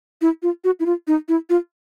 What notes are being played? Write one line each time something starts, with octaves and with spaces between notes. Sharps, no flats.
E4
F4
F#4
E4
F4
D#4
E4
F4